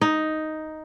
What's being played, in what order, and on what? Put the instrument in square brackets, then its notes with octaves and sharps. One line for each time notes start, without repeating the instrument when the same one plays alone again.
[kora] D#4